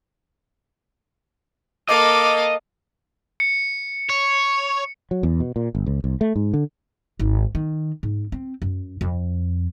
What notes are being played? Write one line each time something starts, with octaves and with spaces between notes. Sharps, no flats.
A#3 A4 D#5 F5 D6
C#7
C#5
F#3
E2
B2
A#2
G1
C#2
C2
A3
G#2
D3
G#1
D#3
G#2
C4
F#2
F2